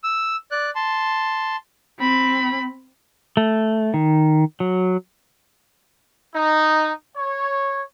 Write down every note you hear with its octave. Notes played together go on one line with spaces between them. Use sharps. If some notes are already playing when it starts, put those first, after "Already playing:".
E6
D5 F#6
A5 C6
C4 B5
A3
D#3
F#3
D#4
C#5